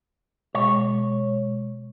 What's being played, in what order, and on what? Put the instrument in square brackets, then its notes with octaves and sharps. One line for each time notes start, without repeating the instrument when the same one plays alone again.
[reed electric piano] B2 G#3 [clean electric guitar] C#5